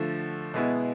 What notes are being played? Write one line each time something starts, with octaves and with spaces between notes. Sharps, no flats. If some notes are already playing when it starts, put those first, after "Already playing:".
Already playing: D3 F3 A3
B2 G#3 B3 E4